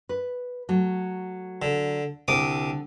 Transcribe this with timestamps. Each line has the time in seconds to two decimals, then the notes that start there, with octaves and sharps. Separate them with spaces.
0.09 B4
0.69 F#3 A3
1.62 D3
2.28 C2 D3 D6 D#6